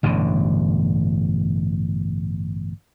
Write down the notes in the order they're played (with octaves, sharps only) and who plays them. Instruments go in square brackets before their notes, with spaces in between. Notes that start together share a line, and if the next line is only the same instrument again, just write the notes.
[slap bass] A1 G2 B2 D3